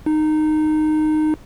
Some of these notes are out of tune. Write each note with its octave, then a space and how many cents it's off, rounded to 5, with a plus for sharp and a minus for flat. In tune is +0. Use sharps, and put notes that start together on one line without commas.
D#4 -15